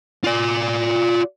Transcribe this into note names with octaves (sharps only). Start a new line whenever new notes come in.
F4 D5